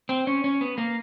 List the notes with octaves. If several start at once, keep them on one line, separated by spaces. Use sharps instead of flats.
C4
C#4
C#4
B3
A#3